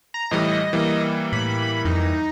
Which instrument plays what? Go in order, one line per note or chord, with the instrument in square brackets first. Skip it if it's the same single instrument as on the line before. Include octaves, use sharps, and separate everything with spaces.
[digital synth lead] A#5
[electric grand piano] A2 E3 G3 [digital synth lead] D#5
[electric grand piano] E3 G3 A#3
[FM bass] A2 [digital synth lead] B5
[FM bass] F2 [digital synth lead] D#4